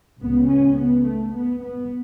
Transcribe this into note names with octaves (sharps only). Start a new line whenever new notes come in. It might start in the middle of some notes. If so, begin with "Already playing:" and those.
C#2 C#3 B3
C#4
B3
A3
B3
B3